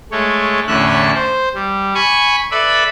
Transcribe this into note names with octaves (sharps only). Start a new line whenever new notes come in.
G#3 A3 C#5
E2 A2 D3 C#4 E5 F#6
C5
G3
G#5 B5 C#6
A4 B4 D5 E5 B5